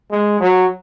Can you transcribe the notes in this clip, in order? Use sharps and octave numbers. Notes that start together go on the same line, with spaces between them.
G#3
F#3